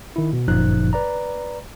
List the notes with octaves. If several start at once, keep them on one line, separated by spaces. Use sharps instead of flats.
D#3 E4
B2
G1 F#2 A#2 F3 D#4 F#6
B4 D5 A#5